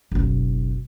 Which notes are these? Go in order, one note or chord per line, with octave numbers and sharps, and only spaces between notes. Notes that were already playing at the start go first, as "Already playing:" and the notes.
F#1 B1